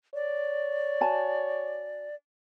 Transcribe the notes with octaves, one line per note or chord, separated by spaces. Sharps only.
C#5 D5
F#4 G#5 A5